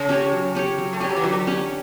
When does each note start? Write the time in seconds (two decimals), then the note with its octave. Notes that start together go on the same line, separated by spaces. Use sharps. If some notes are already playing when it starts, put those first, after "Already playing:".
Already playing: C#3
0.09 C#4 G4 C#5
0.32 F#3
0.55 C#4 G4 C#5
0.78 F#3
0.93 A3
1.00 G3 C#4 G4 C#5
1.09 F#3
1.17 E3
1.24 D3 F#3
1.47 C#4 G4 C#5